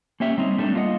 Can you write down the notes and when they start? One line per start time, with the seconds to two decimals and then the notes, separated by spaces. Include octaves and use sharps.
0.20 A#3 C#4 G4 E5
0.38 G3 C4 D#4
0.58 G3 A3 D4
0.74 A#3 F4 D#5 F#5